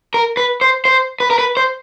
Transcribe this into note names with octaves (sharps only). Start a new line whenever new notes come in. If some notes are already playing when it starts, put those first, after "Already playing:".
A#4
B4
C5
C5
B4
A#4
B4
C5